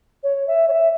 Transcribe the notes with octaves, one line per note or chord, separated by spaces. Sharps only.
C#5
E5
C#5
E5